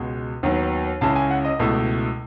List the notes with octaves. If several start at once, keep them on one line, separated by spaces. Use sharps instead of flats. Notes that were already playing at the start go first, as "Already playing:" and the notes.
Already playing: C#2 B2 G#3
D#2 D#3 F#3 B3
C#2 C#3 G#3 C#4 E4 A5
G#5
F#5
D#5
C#2 B2 A3 E4